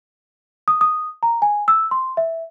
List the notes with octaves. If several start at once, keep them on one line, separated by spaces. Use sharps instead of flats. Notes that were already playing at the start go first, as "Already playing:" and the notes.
D#6
D#6
A#5
G#5
E6
C6
E5